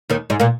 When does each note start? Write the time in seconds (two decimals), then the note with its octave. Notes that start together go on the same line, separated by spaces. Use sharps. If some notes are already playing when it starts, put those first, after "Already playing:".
0.10 D#2 D#3
0.30 G#2 G#3
0.40 A#2 A#3